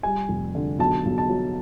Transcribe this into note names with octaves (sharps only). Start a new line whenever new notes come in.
G3 G#5
F1
D3
B1 A5
B1
A5
F#3